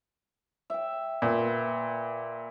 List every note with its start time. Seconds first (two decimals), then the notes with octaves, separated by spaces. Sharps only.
0.70 E5 G5
1.22 A#2 B4 E5